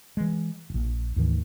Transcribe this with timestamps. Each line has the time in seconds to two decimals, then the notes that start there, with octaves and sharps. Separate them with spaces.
0.17 E3 G#3
0.70 D#1 A#1
1.16 D2 G#2 D#3 E3